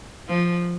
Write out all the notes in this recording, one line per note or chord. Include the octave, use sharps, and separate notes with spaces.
F3